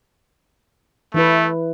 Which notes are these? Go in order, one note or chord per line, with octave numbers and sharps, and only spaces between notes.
E3 A3 E4 B4